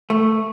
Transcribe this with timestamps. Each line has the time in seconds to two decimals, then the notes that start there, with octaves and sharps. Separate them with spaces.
0.10 A3